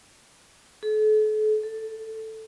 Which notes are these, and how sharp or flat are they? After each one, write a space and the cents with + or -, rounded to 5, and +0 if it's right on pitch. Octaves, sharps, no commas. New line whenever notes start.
A4 -40
A4 +5